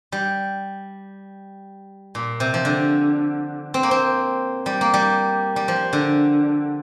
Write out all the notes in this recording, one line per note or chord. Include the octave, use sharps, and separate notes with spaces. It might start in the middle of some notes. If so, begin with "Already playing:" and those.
G3
A#2
C3
F3
D3
C4
A#3
C4
G3
A#3
G3
G3
F3
D3